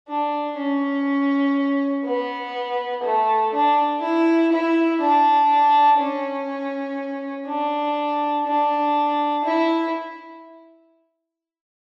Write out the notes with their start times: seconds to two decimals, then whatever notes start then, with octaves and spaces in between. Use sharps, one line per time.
0.08 D4
0.57 C#4
2.05 B3
3.03 A3
3.53 D4
4.02 E4
4.52 E4
5.01 D4
5.99 C#4
7.47 D4
8.47 D4
9.45 E4